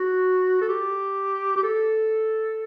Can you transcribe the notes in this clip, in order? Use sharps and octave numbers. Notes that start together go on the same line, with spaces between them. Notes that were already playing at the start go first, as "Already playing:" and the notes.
Already playing: F#4
A4
G4
G4
A4